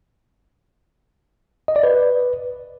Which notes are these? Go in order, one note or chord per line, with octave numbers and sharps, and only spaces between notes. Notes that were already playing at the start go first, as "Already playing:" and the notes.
D#5
D5
B4